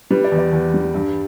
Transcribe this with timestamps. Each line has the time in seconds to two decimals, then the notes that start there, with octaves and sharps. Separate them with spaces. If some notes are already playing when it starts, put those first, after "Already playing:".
0.11 G3 B4
0.24 D5
0.32 E2
0.38 D5
0.52 E2
0.74 G3
0.94 G2